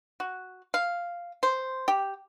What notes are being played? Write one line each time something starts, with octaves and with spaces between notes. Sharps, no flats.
F#4
F5
C5
G4